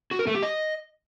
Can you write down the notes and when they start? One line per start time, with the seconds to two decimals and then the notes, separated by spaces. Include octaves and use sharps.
0.11 F#4
0.19 A#4
0.27 A3
0.35 G4
0.43 D#5